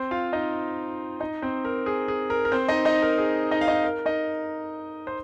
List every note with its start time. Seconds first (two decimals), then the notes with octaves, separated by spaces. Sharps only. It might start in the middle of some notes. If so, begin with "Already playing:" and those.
Already playing: C4 C5
0.11 F4 F5
0.33 D#4 D#5
1.20 D#4 D#5
1.42 C4 C5
1.65 A#4
1.86 G#4
2.08 G#4
2.30 A#4
2.45 A#4
2.52 C4 C5
2.68 D#4 D#5
2.85 D#4 D#5
3.02 A#4
3.18 G#4
3.51 D#4 D#5
3.61 F5
3.68 D#4 D#5
3.84 A#4
4.06 D#4 D#5
5.07 C5